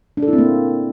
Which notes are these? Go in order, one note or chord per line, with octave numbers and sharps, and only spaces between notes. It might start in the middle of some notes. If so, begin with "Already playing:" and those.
D4
A4
E4
C4
A#3